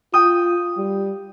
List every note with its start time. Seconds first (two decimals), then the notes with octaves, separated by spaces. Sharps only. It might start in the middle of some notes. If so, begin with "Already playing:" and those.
0.14 F4 G5 D#6
0.77 G3